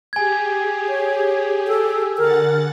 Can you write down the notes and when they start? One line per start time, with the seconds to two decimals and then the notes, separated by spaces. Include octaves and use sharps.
0.13 G4 G#4 G#5 G#6
0.89 C#5
1.67 A4
2.18 D3 A#4 F#5 A6